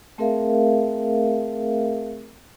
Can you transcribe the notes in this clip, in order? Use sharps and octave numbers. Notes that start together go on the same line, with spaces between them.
A3 C4 G#4 A#4 E5 F5